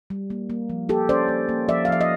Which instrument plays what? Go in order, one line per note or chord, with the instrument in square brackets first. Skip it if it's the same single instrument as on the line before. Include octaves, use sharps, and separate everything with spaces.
[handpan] G3
A#3
A#3
F3
A#3 G4 A4
C#4 C5 D5
A#3
A#3
F3 D5 E5
F5
F3 E5
D#5